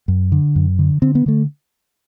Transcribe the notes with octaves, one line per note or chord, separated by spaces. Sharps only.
F#2
D3
F#2
D3
D3 C4
B3
D3 A3